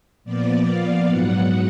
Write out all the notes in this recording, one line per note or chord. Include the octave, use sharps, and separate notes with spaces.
A#2 F3 B3 D5
F5
G#2 F#3 B3 F#5